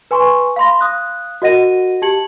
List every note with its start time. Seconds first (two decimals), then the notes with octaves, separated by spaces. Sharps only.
0.11 B4 G#5 C6 C#6
0.56 F5 B5 C6 A#6
0.81 F5 D#6 F#6
1.42 F#4 A#4 D#5 F#5 A#6 D#7
2.02 G4 A5 G#6 C#7 F#7